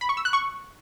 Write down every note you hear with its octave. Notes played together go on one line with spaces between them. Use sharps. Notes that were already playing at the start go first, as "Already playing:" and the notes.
B5
C#6
E6
F#6
C#6